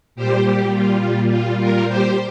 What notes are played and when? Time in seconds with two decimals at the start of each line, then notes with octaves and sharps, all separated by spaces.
0.16 A#2 G3 G4 C5
0.45 G4
0.74 F4
1.31 F4
1.60 F4 A#4
1.88 G4 C5